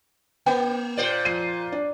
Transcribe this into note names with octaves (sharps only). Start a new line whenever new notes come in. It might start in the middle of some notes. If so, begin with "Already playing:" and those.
A#3 G5
A#2 C5 D5
F3 C7 D#7
D4